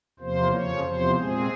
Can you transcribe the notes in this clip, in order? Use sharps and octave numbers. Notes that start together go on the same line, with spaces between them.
E2 C3 F3 A#3 C5
F2 C#3 F3 C#5
E2 C3 F3 C5
A#2 G#3 C4 G#4